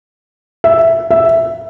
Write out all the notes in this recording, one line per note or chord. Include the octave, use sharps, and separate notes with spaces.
E5
E5